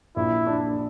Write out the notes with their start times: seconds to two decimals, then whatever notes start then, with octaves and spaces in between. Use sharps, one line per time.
0.16 A#1 E4
0.47 D4